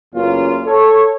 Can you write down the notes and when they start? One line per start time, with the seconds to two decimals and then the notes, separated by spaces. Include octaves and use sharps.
0.13 F#1 E2 A#3 C#4 F4
0.66 A4 C#5